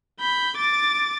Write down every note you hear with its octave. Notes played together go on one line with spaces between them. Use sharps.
B5 G6
D6 A6